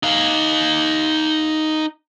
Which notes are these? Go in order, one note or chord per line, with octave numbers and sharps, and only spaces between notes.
D#4 F5